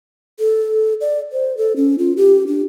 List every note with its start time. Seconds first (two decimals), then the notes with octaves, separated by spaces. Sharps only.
0.39 A4
1.01 D5
1.32 C5
1.57 A4
1.76 C#4
1.98 F4
2.17 G4
2.47 D4